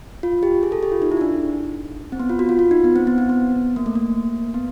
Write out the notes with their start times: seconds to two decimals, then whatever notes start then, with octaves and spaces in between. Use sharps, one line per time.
0.23 F4
0.43 G4
0.63 G#4
0.72 A4
0.83 G4
0.92 F4
1.02 D#4
1.12 E4
1.17 D#4
1.21 D4
2.12 C4
2.19 B3
2.29 F4
2.39 F#4
2.49 F4
2.59 F4
2.71 D#4
2.84 B3
2.96 C4
3.07 B3
3.18 C4
3.29 B3
3.76 A#3
3.86 A3
3.95 A#3
4.54 B3